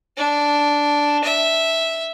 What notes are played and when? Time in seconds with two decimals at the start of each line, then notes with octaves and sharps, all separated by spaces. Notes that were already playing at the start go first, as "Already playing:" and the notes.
0.17 D4
1.24 E5